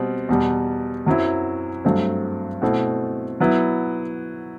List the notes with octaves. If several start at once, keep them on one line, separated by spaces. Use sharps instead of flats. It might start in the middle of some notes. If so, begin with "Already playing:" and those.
Already playing: B2 G3 C4
E2 B2 G3
F#2 F#3 C4 E4
G2 F#3 A3 C4
B2 A3 C4 E4
F#3 B3 E4